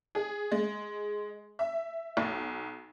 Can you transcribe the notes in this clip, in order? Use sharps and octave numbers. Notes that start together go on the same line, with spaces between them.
G#4
G#3
E5
B1